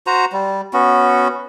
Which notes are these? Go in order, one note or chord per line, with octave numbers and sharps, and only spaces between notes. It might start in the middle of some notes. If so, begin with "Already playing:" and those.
F#4 C5 A#5
G3
B3 C#4 F#4